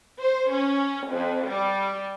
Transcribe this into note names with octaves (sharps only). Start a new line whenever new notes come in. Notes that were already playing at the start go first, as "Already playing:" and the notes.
C5
C#4
F2
G3